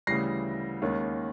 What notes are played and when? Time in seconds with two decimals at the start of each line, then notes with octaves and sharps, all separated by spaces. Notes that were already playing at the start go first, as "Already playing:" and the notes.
0.07 D2 C#3 E3 G3 A#6 C7
0.82 D#2 D#3 G#3 C#4